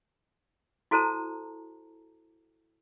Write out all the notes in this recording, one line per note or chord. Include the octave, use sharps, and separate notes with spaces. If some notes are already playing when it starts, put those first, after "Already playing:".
E4 F#4 A4 C5 A5 A#5